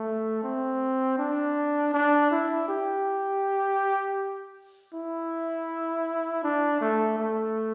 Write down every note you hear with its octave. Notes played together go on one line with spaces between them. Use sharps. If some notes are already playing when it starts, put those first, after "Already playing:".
Already playing: A3
C4
D4
D4
E4
G4
E4
D4
A3
A3